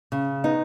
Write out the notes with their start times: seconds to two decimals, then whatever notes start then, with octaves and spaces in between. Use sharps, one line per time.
0.12 C#3
0.44 B3 D#4